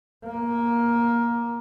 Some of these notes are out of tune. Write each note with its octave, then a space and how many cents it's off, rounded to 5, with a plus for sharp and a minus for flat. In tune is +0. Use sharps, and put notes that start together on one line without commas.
A#3 +15